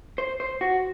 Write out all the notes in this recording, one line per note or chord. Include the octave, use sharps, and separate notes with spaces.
C5
C5
F#4